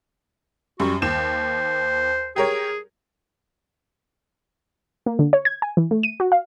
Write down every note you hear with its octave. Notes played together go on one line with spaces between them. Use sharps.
F#2 G3 F#4
D#2 C5 E7
G4 G#4 A#4 C#5
A#3
D3
C#5
G#6
G#5
E3
A3
D#7
F#4
F5